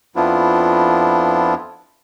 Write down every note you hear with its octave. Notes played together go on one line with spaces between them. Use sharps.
F2 F3 B3 D4 E4 F4